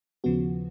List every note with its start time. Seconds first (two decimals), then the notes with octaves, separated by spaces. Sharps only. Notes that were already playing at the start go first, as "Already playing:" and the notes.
0.24 D#2 C#3 F3 B3 F#4